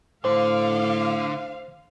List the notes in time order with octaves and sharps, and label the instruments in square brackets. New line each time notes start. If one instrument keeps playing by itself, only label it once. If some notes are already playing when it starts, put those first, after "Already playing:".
[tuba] A2 [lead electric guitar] D3 [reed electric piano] C5 [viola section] F5